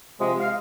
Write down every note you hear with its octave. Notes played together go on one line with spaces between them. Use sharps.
C3 F3 G#3
F5